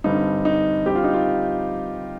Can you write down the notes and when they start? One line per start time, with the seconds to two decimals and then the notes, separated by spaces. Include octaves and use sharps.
0.04 G2 D3 G3 C4 D#4
0.45 D#4
0.85 D3 G3 C4 G4
0.95 F4
1.04 D#4
1.14 F4